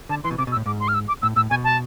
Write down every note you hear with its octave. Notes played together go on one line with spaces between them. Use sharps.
D3 A5
E3 C6
B2
C3 D6
B2
E6
A2
G#2 D6
C6
F6
E6
D6
A2 E6
A2 E6
B2 G#5
A5